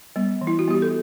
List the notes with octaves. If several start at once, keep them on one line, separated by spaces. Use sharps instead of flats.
G3 B3
E3
E4
F#4
G3 B3 G4
A4